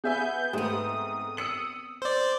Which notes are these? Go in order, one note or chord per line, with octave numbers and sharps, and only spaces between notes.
B3 G#4 E5 G#5 G6
G#2 A3 B3 C4 D#6
E6 C#7 F#7
C5 D5